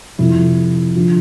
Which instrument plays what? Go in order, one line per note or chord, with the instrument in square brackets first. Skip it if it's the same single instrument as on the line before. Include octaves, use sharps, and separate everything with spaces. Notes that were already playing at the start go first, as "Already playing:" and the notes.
[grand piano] F2 C3 F3 E4
D3 F3